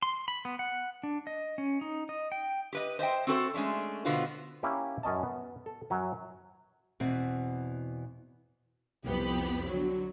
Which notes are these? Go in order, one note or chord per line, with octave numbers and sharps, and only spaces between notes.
C6
B5
B3
F#5
D4
D#5
C#4
D#4
D#5
G5
G4 B4 D#5
C5 D#5 E5 G5
C4 F#4 A4 C5
G#3 A3 C#4 D4
B2 D3 B3 F4 F#4 C5
A#3 C#4 E4 G4
F#2 C#4 D#5 A5
B3
A4
F#2 F#3 C#4
E2 B2 E3 C4
C2 F2 B3 G4 B5
D3 F#3